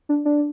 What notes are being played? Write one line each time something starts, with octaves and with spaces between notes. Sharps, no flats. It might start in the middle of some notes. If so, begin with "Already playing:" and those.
D4
D4